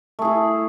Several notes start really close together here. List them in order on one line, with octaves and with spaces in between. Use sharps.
A3 G#4 E4